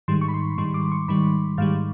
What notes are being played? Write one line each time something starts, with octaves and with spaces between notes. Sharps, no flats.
G#2 D#3 G3 C6
C#6
B5
C6
G#2 D#3 G3 C6
D6
C#6
G#2 D#3 G3 B5
G#2 D#3 G3 F5